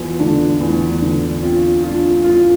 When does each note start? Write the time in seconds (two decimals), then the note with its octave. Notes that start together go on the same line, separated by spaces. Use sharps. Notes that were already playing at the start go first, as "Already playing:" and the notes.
Already playing: E2 F4
0.20 D3 D4
0.60 E2
1.02 D3
1.42 C4 F4
1.83 D4 F4
2.24 F4